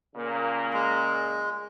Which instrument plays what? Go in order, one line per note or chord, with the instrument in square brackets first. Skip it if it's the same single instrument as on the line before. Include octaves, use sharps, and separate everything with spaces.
[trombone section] A#2 C#3 A#3
[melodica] G#3